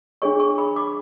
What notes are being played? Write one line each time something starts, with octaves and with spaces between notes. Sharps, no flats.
D4 G#4 C#5 C#6
C#6
B5
D6